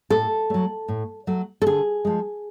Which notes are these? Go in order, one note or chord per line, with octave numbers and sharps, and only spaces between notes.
A2 A4
F#3 A3
A2
F#3 A3
A4
D3 G#4
F3 G#3